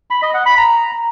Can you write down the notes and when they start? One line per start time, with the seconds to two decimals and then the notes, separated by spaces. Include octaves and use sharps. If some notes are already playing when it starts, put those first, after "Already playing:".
0.11 B5
0.22 D#5
0.34 F#5
0.46 B5
0.58 A#5